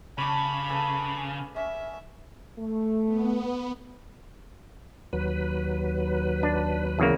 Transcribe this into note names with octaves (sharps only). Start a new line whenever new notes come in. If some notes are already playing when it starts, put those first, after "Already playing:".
C#3 C#5 D5 A5 B5
G#4 A4 B4
C#4 E5
A3
B3
D#2 F#3 B4
D4
E2 C#3 A#3